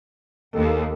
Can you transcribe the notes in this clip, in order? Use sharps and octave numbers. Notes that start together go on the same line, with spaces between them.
D#2 A4